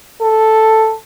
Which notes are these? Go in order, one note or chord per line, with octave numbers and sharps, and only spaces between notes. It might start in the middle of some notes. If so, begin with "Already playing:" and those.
A4